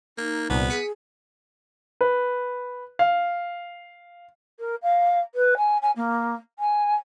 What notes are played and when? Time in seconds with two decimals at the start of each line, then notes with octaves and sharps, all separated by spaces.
0.18 A#3 D#4
0.50 C2 A#2 B3
0.70 G#4 B6 C#7 D#7
2.01 B4
2.99 F5
4.59 A#4
4.82 F5
5.35 B4
5.57 G#5
5.82 G#5
5.96 A#3
6.59 G#5